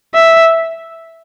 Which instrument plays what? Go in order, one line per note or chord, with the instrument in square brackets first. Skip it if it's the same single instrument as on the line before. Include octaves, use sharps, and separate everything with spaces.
[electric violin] E5